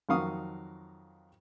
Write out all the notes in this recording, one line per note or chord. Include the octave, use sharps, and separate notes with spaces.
F2 D#3 F#3 F5 C#6 D#6